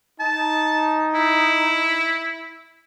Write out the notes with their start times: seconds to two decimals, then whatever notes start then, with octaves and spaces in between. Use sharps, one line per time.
0.20 D#4 A5
1.14 E4